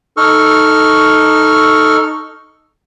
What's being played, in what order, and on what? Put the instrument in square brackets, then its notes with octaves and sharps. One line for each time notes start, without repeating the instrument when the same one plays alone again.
[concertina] D#4 A4 C#6 F6